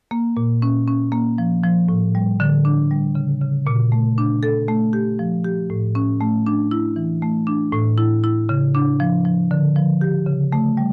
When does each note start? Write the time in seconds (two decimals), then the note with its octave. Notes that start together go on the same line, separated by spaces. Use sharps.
0.11 A#3
0.37 A#2
0.62 C#4
0.88 C#4
1.12 A#3
1.38 F3
1.64 F3
1.89 A2
2.15 G3
2.40 D3
2.65 D4
2.91 G3
3.15 C#3
3.41 C#3
3.67 A#2
3.92 A3
4.18 D4
4.43 A4
4.68 A3
4.93 G4
5.19 F3
5.45 G4
5.70 A2
5.95 C#4
6.21 A3
6.47 D4
6.71 E4
6.96 E3
7.22 A3
7.47 D4
7.72 A2
7.98 E4
8.24 E4
8.49 C#3
8.75 D4
9.00 F3
9.25 F3
9.51 D3
9.76 F3
10.01 G4
10.26 C#3
10.52 A3
10.77 G3